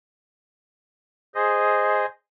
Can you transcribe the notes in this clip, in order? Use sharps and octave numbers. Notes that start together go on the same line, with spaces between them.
G#4 C5 D#5